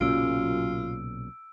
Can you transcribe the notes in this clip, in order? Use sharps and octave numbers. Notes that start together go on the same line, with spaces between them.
B1 F#2 A#2 C#3 F4 E6 D7